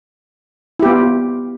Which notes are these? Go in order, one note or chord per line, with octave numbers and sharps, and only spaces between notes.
B3 E4 F4 G4